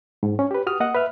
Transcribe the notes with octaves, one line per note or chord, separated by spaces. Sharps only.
G#2
C#4
G4 B4
F#4 G4 D#6 F6
A#3 D#5 F#5 D#6
B4 E5 F6